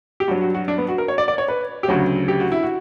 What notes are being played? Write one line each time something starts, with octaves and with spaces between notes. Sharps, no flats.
G4
G2 F#3 F#4
F#4
F#4
D4
B3
F#4
A#4
C#5
D5
D5
C#5
B4
G4
D2 C#3 F#3 F#4
G4
F#4
E4
F#4